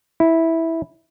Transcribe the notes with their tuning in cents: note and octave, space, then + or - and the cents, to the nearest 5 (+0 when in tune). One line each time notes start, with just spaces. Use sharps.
E4 -10